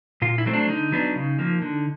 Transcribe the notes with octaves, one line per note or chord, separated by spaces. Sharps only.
A#2 F4
E4
F#3 A3 C4
D4
D3 D#4
F#3 B3 D4
C#3
F3 A#3
D3